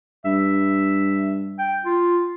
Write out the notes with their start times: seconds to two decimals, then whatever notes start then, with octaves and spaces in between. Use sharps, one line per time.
0.25 G2 E5
1.59 G5
1.85 F4